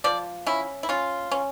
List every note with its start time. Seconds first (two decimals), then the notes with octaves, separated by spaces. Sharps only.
0.04 F3 D5
0.46 C#4 E4
0.83 E4
0.89 C#4 F4
1.31 C#4